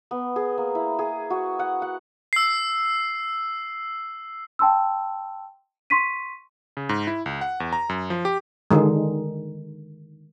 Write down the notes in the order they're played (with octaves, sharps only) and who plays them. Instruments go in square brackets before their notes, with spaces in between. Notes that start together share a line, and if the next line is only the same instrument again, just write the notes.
[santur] B3
G#4
A#3
E4
G#4
F#4
F#5
F#5
[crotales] E6 C7
[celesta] G5 A5 C6 E6
C6 C#6 B6 D#7
[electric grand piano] C#3
G#2
E4
C#2
F#5
E2
A#5
F#2
F3
G4
[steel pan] D3 D#3 G#3